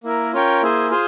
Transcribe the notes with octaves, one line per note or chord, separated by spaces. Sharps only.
A#3 E4 A#4
C#4 F4 A#4 C#5 G5
A#3 E4 G#4 C5
F4 G#4 C5